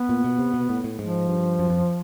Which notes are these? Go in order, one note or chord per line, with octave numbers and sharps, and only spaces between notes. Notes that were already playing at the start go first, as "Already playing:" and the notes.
Already playing: B3
A#2
B2
C3
B2
A2
A2
G#2 F3
G2
F#2
F2